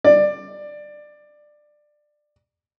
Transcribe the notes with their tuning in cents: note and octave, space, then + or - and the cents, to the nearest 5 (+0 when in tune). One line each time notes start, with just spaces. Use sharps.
D5 +15